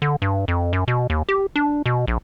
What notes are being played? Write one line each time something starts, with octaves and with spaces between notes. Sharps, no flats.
D3
G2
F2
F#2
B2
D#2
G4
D4
B2
A#1